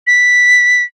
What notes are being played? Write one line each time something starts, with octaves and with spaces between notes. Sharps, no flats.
B6